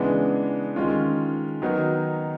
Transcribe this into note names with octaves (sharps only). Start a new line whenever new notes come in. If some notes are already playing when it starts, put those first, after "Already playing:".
Already playing: C#3 E3 G#3 B3 D4
D#3 G#3 C#4 F4
D#3 F#3 B3 D#4